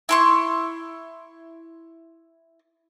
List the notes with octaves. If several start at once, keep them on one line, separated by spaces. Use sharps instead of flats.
E4 C6 C#6